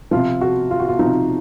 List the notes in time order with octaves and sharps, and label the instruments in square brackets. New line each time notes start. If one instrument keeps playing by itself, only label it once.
[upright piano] C3 F3 F4
F#4
F4
F#4
F4
C3 F3 D#4